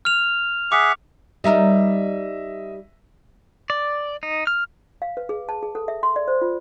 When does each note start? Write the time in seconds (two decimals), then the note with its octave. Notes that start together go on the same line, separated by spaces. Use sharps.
0.05 F6 F7
0.72 G#4 E5 F#5 D6
1.44 G3 D#4 A#4 D#5 E5
3.70 D5
4.23 D#4
4.47 F6
5.02 F5
5.17 B4
5.29 G#4
5.49 A5
5.63 G#4
5.75 A4
5.88 E5
6.03 C6
6.16 D5
6.28 C5
6.42 F4